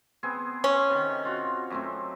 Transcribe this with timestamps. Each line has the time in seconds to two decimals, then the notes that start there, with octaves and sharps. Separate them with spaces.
0.23 B3 C4 G#4
0.64 C#4
0.90 C3 D#3
1.25 F4 F#4
1.70 F#2 A3 C4